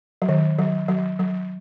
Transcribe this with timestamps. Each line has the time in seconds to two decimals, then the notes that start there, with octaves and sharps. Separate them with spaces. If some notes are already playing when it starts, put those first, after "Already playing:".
0.22 F#3
0.29 D#3
0.59 F#3
0.88 F#3
1.19 F#3